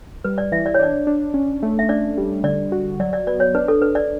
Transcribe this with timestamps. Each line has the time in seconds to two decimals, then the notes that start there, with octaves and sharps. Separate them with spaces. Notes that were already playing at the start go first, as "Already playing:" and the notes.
0.24 G3 B4
0.38 D5
0.52 E3 E5
0.66 D5
0.74 C#5
0.79 D4 D5
1.07 D4
1.34 C#4
1.63 A3
1.79 E5
1.89 D4 D5
2.18 G3
2.44 D3 D5
2.72 F#4
3.00 F#3 D5
3.13 D5
3.27 B3 D5
3.40 C#5
3.55 D4 B4
3.68 A4
3.81 D4 B4
3.95 D5